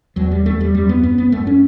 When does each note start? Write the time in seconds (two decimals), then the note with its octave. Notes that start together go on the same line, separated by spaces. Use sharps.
0.16 E2 F#3
0.31 G3
0.46 E2 A3
0.61 G3
0.75 F#2 G3
0.89 B3
1.03 F#2 B3
1.18 B3
1.32 F#2 A3
1.47 C#4